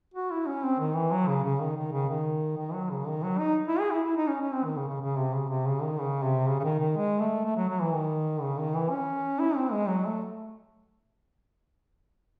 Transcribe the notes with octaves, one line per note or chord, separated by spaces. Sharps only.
F#4
E4
C#4
C4
D#3
E3
F#3
C#3
C#3
D#3
D#3
C#3
D#3
D#3
F#3
C#3
D#3
F#3
D#4
E4
G#4
E4
E4
D#4
C#4
C#4
C4
D#3
C#3
C#3
C#3
C3
C#3
C3
C#3
D#3
C#3
C3
C#3
C#3
D#3
D#3
G#3
A3
A3
F#3
F#3
E3
D#3
C#3
D#3
E3
C#4
E4
C4
G#3
F#3
A3